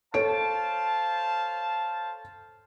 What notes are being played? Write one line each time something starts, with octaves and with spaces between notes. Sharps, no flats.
A4 C5 C#5 F5 A5 D7